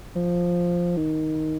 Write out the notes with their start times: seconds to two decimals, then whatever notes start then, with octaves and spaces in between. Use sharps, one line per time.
0.16 F3
0.97 D#3